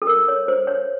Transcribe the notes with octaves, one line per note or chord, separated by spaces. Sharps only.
A4
A#4
C#5
C5
C#5